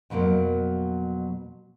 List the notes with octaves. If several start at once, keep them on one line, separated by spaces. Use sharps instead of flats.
F2 B2 F#3 G3 A#3